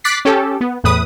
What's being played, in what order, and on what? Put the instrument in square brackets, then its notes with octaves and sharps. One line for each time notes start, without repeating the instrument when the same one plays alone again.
[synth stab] D6 F#6 A6 B6 C7
C#4 G4 A4
B3
E2 A2 B4 D#6